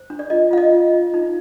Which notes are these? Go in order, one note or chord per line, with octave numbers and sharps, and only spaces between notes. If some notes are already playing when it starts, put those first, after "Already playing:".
Already playing: C5
D4
D5
F4 D#5
F4 F5
D#5
F4
F4
D#4